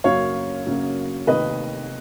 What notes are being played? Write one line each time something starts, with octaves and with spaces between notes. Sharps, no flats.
F#2 C#3 F#3 A#3 C#5 F5
F#2 C#3 F#3 A#3
F1 D#2 D#3 B4 D#5